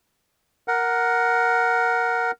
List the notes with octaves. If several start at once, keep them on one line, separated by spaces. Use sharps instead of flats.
A#4 F#5